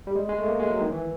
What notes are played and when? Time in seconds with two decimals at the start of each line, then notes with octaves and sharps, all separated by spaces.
0.07 G3
0.16 G#3
0.29 G#3
0.39 A3
0.48 A#3
0.60 G#3
0.70 F#3
0.81 D#3
0.92 E3